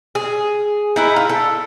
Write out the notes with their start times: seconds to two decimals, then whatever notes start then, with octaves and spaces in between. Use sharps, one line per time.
0.15 G#4
0.96 D#4 E4 B4
1.16 F4
1.29 A4